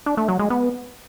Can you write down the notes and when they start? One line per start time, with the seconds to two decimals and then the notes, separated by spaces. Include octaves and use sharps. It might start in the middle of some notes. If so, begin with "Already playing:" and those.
0.06 D4
0.17 A3
0.28 F#3
0.39 G#3
0.50 B3